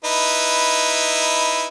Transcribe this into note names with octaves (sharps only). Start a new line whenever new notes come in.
D#4 E4 B4